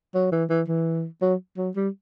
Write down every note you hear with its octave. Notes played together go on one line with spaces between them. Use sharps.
F#3
E3
E3
E3
F#3
F#3
G3